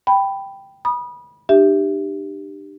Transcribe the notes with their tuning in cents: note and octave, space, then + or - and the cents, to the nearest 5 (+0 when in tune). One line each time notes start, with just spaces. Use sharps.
G5 +0 B5 +5
B5 -25 D#6 -20
D4 +35 G4 +0 E5 +0